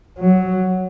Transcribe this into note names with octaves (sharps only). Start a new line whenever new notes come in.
F#3